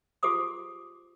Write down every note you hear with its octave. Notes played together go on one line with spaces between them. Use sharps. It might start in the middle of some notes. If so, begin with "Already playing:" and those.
F4 G4 G#4 C5 D6 D#6